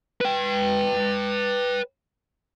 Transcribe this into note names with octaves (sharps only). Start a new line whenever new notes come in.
B4 G5